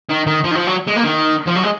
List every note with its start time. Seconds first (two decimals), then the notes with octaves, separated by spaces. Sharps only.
0.10 D#3
0.27 D#3
0.44 F3
0.51 D#3
0.55 F3
0.67 F#3
0.87 G#3
0.96 A#3
1.04 D#3
1.47 F3
1.56 F#3
1.64 G#3